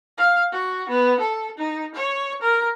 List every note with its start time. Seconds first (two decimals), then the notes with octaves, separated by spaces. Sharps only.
0.18 F5
0.52 F#4
0.89 B3
1.20 A4
1.58 D#4
1.95 C#5
2.42 A#4